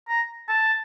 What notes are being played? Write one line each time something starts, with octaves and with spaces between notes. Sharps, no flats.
A#5
A5